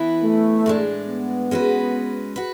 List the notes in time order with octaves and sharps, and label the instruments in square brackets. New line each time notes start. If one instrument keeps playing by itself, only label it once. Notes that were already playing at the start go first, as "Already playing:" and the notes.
Already playing: [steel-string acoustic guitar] E3 B3 E4 B4
[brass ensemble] A3
[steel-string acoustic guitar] A2 G#3 D4
[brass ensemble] B3
[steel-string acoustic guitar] G#3 C#4 F#4 B4
F#4 B4